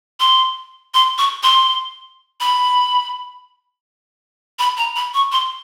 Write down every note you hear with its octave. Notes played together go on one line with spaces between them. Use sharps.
C6
C6
C#6
C6
B5
B5
A#5
B5
C#6
C6